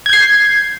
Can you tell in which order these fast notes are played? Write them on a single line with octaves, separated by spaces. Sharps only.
G#6 G6 C7